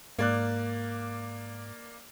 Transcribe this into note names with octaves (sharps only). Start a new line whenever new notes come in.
G#2 A#3 D5 F#6